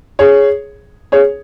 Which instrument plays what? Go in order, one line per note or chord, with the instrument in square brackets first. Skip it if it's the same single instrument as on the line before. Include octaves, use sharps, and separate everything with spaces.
[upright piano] G#4 C#5
G#4 C#5